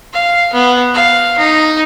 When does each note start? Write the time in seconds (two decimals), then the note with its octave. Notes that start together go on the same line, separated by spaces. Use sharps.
0.14 F5
0.53 B3
0.95 F5
1.38 D#4